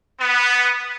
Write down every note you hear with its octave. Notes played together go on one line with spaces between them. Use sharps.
B3